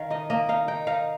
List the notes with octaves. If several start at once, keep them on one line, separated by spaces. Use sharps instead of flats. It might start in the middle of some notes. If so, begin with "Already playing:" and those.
Already playing: D#3 F5
D#4 D#5
A#3 D#5
D#4 F5
D#4 G5
D#4 F5